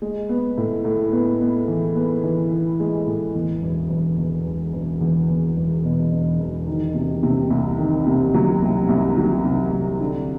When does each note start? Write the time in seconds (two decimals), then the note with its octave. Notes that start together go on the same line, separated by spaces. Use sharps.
0.02 G#3
0.29 B3
0.57 A2
0.85 A2
1.12 B3
1.41 B3
1.68 E3
1.95 B3
2.24 E3
2.51 E3
2.80 G#3
3.07 A2
3.35 E2
3.62 E1
3.89 E1
4.17 E2
4.46 E1
4.73 E1
5.01 E2
5.29 E2
5.57 E1
5.84 B2
6.12 E1
6.40 E1
6.67 D#3
6.94 C3
7.23 C3
7.50 C2
7.78 D#3
8.06 C3
8.34 F#3
8.62 C2
8.89 C2
9.17 F#3
9.45 C3
9.72 C2
10.01 D3